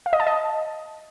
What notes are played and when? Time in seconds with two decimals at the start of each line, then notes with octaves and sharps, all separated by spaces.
0.06 F5
0.13 D#5
0.20 A5
0.27 D#5